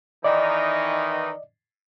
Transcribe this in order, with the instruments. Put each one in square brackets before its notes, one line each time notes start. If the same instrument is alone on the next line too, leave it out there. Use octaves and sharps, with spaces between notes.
[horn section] D#3 E3 D#4 [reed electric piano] D5 D#5